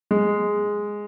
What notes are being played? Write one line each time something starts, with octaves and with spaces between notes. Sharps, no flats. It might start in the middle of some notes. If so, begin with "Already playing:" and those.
G#3